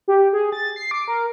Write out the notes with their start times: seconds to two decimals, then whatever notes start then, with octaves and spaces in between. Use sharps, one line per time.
0.08 G4
0.33 G#4
0.52 A6
0.76 C7
0.91 D6
1.08 A#4